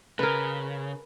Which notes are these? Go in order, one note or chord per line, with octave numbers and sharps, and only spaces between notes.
C#3 A#4 B4